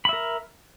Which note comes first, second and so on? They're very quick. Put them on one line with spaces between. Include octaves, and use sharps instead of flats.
B5 E5 A#4